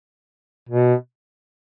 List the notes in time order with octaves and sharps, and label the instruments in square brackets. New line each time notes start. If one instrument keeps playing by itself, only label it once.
[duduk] B2